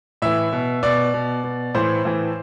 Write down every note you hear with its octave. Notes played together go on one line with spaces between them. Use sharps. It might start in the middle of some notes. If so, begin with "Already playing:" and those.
A2 E3 E5
B2
B2 D5
B2
B2
A2 E3 C5
A2 E3